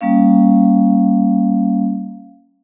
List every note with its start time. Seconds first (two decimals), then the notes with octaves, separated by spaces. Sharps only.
0.01 G3 A#3 C#4 F5